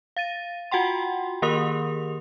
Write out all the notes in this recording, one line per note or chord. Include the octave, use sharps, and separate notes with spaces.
F5 A6 D#7
F4 F#4 F#5 G5 C6
D#3 A#3 G4 A#4 D#6 F7